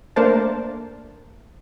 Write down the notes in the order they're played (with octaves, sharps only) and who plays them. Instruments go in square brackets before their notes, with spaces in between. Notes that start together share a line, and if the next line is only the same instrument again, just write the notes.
[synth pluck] A3 A#3 D4 A#4 C5 A5